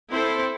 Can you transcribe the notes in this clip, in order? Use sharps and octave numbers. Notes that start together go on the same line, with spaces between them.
C4 E4 A4 C5